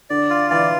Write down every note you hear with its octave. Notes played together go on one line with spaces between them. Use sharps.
D3 D5
F4
E3 D5